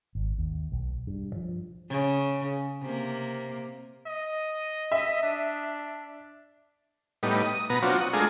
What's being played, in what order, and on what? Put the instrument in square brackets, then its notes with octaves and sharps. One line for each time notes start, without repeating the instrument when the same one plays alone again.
[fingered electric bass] G#1
D#2
B1
G2
F3
[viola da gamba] C#3
C3 A#3
[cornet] D#5
[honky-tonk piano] E5
[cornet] D4
[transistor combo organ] A2 G3 B3 D#4
D#6
B2 B3 A#5
F#3 C4 D4 F4 F#4
F#5 D#6
G#3 A3 D4 F4 G#4 A#4